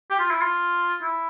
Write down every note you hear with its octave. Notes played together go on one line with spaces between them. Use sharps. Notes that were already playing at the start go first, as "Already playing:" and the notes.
G4
F4
E4
F4
E4